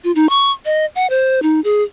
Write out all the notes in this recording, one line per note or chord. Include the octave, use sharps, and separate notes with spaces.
F4
D#4
C#6
D#5
F#5
C5
D#4
G#4